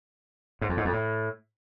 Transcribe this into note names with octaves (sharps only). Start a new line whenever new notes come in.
G#2
F2
G#2
F2
A2